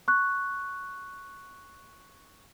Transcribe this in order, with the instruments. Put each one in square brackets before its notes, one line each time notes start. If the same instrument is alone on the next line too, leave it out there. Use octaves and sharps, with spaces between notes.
[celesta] C#6 F#6